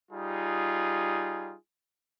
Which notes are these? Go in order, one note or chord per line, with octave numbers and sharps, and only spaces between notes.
G3 D#4 F4 G#4